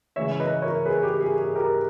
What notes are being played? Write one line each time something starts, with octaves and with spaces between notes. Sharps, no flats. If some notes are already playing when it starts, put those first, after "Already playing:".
C#3 E3 G#3 C#5 E5
B4 D#5
A#4 C#5
G#4 B4
G4
G#4
G#4
G4 A#4